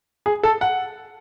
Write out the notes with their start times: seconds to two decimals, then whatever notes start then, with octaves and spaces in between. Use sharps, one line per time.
0.26 G#4
0.43 A4
0.61 F#5